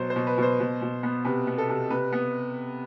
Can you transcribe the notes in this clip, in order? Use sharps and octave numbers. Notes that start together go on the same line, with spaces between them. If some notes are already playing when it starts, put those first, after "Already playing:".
Already playing: B2 F#3 C5
C5
B2
B4
B2 C5
B2
B2
B3
C3 B4
B3
A4
C3
C3 B4
B3